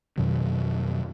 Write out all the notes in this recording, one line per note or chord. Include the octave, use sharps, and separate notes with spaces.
F2 B2 D#3 F#3